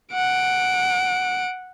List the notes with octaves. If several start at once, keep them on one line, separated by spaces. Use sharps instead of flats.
F#5 D7